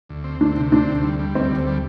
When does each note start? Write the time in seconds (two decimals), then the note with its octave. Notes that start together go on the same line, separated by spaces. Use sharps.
0.09 D2
0.24 C4
0.40 D2 D4
0.56 C3
0.72 C4 D4
0.88 D2
1.04 G3
1.19 G3
1.35 D2 C4
1.52 D2
1.67 G3